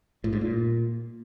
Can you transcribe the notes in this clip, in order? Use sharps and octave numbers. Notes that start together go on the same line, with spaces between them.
A2
G#2
A#2